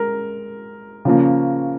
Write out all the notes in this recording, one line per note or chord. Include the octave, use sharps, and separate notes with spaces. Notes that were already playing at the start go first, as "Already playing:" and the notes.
Already playing: G#3 A#4
C#3 F3 A#3 C#4